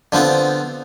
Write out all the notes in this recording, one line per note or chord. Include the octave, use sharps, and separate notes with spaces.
D3 F3 B3 C4